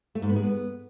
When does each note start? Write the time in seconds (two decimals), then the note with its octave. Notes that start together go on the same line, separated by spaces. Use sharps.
0.15 A3
0.22 G#2
0.29 B3
0.36 G#3
0.43 B3